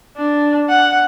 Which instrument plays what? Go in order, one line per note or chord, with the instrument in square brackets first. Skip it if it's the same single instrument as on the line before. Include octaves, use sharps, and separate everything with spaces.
[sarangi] D4
F#5